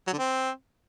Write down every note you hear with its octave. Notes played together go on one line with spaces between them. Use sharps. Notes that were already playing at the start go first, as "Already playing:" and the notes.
F#3
D3
C4